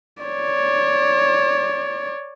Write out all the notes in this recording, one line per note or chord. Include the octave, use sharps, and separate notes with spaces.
C#5 D5